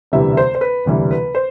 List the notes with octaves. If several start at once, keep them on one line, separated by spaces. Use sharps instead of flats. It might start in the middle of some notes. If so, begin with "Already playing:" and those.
E1 D2 C3 E3 G3 E5
C5
C5
B4
E1 D2 C3 E3 G3
B4
C5